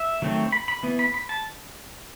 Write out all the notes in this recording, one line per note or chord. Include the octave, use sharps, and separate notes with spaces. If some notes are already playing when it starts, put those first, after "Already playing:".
Already playing: E5
D#3 F#3 A3 C4
B5
B5
E3 B3
B5
B5
A5